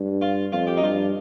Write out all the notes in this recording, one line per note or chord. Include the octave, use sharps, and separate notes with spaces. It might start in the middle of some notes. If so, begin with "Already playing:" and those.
Already playing: G2
F4
F2 F4
G4
D#4
G2 F4